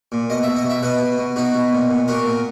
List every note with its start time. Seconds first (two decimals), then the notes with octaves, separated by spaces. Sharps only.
0.12 A#2
0.30 B2 D#5
0.43 B2 E5
0.56 D#5
0.65 B2 E5
0.83 B2 B4 D#5
1.01 B2
1.18 B2
1.36 B2 D#4 F#4
1.55 B2
1.73 A#2
1.91 A#2
2.08 A#2 F#4 A#4
2.27 A#2